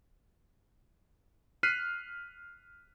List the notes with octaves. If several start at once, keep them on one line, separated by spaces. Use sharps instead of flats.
F6 F#6 B6 C7 D#7